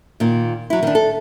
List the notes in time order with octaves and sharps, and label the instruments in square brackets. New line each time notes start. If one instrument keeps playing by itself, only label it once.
[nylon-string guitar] A#2 D#3
F#3 E4
D#3 D4
A4